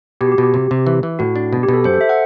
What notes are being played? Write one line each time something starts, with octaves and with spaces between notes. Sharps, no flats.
B2 G4
F#4
G4
B2
G4
C3
C3
E3
E3
A2 F#4
D4
B2
G4
B2 A4
F#2 C5
A4
E5
F#5